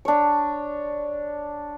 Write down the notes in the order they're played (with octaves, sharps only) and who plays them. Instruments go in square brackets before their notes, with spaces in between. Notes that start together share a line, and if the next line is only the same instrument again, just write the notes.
[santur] D4 C#5